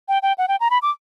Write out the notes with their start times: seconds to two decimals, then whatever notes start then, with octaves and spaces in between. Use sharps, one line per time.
0.08 G5
0.22 G5
0.38 F#5
0.48 G5
0.60 A#5
0.71 B5
0.82 D6